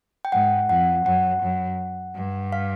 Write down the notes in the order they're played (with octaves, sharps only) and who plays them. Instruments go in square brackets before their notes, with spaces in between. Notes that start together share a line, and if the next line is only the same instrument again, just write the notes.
[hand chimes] G5
[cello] G#2 [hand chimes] F#5
[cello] F2 [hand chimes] F#5
[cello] F#2 [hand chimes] F#5
[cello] F#2
G2
[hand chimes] F5